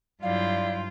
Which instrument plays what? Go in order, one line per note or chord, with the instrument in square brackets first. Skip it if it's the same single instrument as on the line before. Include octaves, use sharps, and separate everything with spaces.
[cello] G2 F4 [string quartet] F#3 E4 G5 [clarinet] D5 [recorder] F5